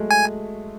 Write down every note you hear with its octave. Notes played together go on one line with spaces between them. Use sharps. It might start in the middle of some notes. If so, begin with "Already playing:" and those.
Already playing: F#3 G#3 A3
G#5